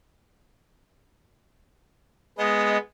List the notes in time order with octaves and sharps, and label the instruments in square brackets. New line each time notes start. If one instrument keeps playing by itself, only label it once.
[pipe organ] G#3 B3 [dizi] D#5